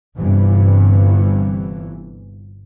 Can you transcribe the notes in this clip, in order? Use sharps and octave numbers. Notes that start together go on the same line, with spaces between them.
G1 G2 C3 E3